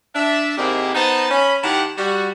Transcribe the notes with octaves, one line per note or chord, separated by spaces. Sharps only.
D4 E5
G#2 C3 D#3 A#3 C4 E4
B3 D#4 C5 D#5 F#5 A5
C#4 B5
D#3 E4 G4 F#5 A5 A#5
G3 F#4